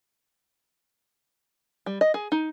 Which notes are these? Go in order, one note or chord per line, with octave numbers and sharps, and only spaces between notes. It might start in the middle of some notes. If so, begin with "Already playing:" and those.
G3
D#5
G#4
D#4